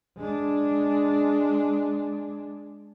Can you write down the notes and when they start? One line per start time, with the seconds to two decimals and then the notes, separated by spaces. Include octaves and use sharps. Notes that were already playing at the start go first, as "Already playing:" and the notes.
0.18 G#3 D4